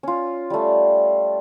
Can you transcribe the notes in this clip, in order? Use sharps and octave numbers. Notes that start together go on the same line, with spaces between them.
C#4 F4
G3 A3